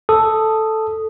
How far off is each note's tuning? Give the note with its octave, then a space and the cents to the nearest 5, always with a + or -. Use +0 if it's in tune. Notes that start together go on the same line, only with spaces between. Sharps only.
A4 +0 D#6 +0